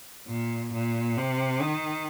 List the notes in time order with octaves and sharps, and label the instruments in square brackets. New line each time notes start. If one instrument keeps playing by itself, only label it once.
[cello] A#2
A#2
C3
D#3